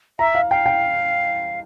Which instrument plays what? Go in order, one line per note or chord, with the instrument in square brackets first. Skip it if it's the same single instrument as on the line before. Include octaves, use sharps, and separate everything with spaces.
[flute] E5 [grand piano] A#5
[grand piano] F5
[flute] F5 [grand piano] G5
[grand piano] G5